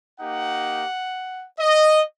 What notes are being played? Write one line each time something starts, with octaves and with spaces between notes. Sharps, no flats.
A#3 D#4 G4 F#5
D#5